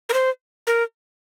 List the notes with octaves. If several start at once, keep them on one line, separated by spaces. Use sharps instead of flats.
A#4
C5
A#4